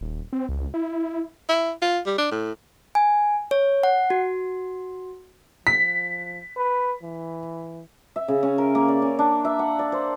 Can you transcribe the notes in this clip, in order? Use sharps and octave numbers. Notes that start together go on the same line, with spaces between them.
D#1
C4
C#2
E4
E4
F4
G3
D4
A2
G#5
C#5
F#5
F#4
F3 B6
B4
E3
E5
C#3
C#4
A#4
A#3
D5
C#4
D4
E5
F#5
D5
C5